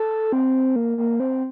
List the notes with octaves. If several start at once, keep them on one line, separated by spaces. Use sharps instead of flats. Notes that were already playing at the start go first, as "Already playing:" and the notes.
Already playing: A4
C4
A#3
A#3
C4